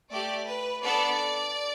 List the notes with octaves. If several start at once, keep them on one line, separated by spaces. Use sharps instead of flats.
A3 G4 D5
B4
B3 D4 A4 D5